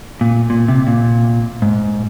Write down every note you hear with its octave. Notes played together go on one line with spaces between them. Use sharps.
A#2
A#2
C3
A#2
G#2